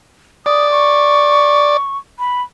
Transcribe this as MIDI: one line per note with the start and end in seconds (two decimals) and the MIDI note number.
0.46 1.77 74
0.46 0.70 87
0.71 1.97 85
2.19 2.42 83